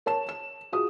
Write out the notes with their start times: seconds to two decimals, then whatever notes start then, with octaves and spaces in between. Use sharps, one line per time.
0.06 A#4 C#5 A5 E7
0.29 E7
0.72 F4 F#4 G#4 D#6